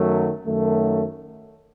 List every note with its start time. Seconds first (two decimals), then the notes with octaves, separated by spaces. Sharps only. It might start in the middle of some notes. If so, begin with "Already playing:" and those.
Already playing: F#2 D#3 F#3 A3
0.46 F#2 D#3 F#3 A3